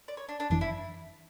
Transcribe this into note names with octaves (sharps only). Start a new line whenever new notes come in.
D5
C#5
D4
D4
G1 F#2 E3 D4
E4